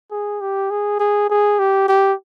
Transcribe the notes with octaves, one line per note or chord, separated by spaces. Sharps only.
G#4
G4
G#4
G#4
G#4
G4
G4